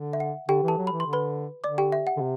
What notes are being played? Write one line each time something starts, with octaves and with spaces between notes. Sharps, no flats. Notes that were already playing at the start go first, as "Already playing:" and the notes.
Already playing: D3
E5
F#5
D3 G4 G5
E3
A4 A5
F#3
E3 B5
C6
D3
B4 B5
D3 D5 D6
G4 G5
E5
F#5
D3
C3